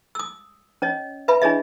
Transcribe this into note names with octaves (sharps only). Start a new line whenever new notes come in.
D#6 E6
C#4 C#5 D#5
B4 E5 B5
D4 E4 G#4 C#5 D#5 E5